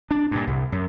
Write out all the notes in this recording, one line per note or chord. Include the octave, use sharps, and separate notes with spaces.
D4
G2 A#2
C2
F#2